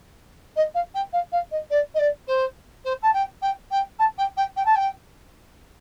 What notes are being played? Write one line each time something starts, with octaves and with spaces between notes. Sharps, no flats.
D#5
F5
G5
F5
F5
D#5
D5
D#5
D5
C5
C5
A5
G5
G5
G5
A5
G5
G5
G5
A5
G5